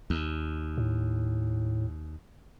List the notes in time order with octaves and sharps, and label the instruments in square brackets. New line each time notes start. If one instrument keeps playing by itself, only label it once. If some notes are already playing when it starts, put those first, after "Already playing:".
[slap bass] D#2
[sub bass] A2